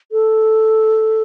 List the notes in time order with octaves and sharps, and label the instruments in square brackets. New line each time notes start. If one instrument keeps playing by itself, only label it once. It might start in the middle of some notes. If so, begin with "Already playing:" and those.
[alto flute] A4